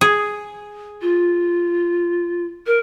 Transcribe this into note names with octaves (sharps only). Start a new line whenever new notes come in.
G#4
F4
A#4